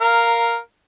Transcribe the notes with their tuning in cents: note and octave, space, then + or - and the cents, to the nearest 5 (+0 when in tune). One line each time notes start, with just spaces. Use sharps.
A#4 +0 F5 +0 A#5 -15